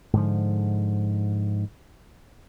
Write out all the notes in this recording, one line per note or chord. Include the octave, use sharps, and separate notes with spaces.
G#2 D3 F3